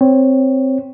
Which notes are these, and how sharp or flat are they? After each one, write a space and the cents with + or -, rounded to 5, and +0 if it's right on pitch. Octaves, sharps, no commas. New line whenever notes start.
C4 +0 C#5 +0